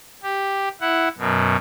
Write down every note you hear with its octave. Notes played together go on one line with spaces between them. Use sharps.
G4
E4 F#5
F#2 B2